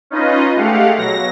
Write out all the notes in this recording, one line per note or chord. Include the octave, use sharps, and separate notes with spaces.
C#4 D#4 F4 B4 D#5
G#3 A3 G4 F5 F#5
B2 F#3 A#6